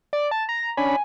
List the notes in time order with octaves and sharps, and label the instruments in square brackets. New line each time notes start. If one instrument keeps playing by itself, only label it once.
[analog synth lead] D5
A5
A#5
[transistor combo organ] C#4 D4 B5 [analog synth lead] G#5